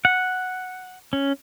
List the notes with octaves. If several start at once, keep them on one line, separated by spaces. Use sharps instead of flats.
F#5
C#4